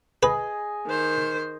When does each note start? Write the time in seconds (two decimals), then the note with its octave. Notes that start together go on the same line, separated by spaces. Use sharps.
0.23 G#4 B4 D#5 G#5
0.86 D#3 C5